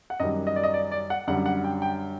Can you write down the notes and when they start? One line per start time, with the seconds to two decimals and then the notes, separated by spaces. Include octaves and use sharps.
0.10 F#5
0.20 F#2 D#3 G3 D#5
0.47 D#5
0.56 D5
0.63 D#5
0.74 D5
0.91 D5
1.10 F#5
1.27 F#2 D3 G3 F#5
1.46 F#5
1.64 G5
1.82 G5